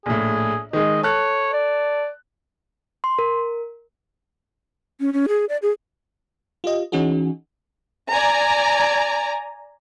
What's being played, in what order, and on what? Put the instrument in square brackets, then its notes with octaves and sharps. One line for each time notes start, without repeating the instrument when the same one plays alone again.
[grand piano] A#1 A2 [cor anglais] G#4
[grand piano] D#3 G#3 [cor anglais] D#5
[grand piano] A4 F#6 [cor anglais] C#5
[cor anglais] D5
[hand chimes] C6
A#4
[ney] C#4
C#4
G#4
D5
G#4
[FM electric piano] F4 G4 D#5
E3 C#4 D#4 F#4 G#4
[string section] D5 G#5 A#5